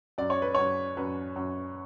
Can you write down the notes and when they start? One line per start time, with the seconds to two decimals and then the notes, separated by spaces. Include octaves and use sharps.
0.18 F#2 D5
0.30 C#5
0.42 B4
0.55 F#2 C#5
0.97 F#2 B4
1.36 F#2